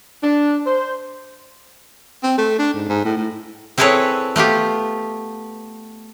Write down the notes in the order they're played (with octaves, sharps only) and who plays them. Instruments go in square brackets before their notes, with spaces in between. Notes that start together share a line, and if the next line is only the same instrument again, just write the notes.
[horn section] D4
C5
[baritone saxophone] C4
A3
D4
G#2
G#2
A2
A2
[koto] C4 E4 G#4 A4 B4 C#5
A3 B3 F4 G4